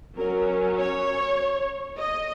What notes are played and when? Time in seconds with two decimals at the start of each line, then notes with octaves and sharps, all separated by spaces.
0.18 F#3 C#4 A#4
0.78 C#5
1.99 D#5